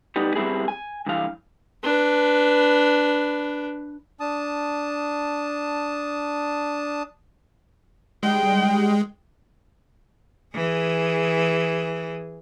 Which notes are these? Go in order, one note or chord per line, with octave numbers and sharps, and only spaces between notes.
G3 B3 D#4
G3 B3 C4 E4 G#4
G#5
G2 E3 F5
D4 B4
D4 A5 D#6
G3 G#3 G5
E3 G#4